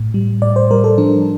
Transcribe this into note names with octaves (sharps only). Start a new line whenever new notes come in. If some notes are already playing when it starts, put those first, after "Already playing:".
Already playing: A2
G3
A2 D5
C5
G3 A#4
A4
F3 D4